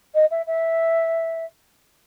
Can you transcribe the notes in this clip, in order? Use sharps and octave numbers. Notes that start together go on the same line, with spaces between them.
D#5
E5
E5